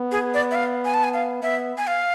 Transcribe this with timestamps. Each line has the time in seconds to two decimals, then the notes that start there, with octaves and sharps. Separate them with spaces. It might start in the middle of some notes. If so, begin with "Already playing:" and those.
Already playing: B3
0.12 G#4
0.34 D5
0.51 E5
0.55 F5
0.85 G#5
0.94 A5
1.04 G#5
1.14 F5
1.42 B3 E5
1.77 G#5
1.87 F5